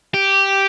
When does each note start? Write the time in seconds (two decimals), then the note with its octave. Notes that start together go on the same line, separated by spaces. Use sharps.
0.14 G4